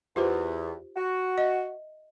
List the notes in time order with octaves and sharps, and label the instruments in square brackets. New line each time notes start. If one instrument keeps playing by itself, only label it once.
[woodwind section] E2 [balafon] F4 G4 C5
[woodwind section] F#4
[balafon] D#5 E5